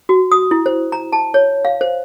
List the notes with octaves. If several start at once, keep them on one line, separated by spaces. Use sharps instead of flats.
F#4
D#6
E4
C5
A#5
A5
C#5
F5
C5